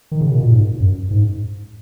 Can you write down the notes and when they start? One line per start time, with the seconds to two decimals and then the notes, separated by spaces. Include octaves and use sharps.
0.12 D#3
0.21 C#3
0.31 B2
0.40 A#2
0.50 G#2
0.80 F#2
1.11 G#2